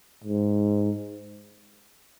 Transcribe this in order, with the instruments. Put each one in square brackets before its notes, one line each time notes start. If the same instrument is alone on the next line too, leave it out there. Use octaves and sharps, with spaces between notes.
[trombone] G#2